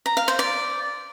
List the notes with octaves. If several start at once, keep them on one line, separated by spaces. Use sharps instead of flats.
A#5
F5
C5
D5